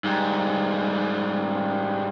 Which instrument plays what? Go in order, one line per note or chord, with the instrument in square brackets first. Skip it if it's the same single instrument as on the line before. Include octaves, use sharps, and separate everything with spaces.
[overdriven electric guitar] G#2 G3